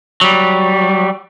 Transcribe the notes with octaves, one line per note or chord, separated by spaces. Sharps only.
F#3 G3